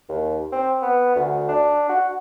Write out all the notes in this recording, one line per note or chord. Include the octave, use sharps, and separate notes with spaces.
D#2
C4
B3
D2
D4
F#4